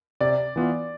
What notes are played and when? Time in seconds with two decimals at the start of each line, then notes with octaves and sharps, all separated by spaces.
0.21 C3 D5
0.56 E3 B3 F4